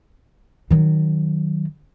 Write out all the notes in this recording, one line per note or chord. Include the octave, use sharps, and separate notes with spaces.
D#3 F#3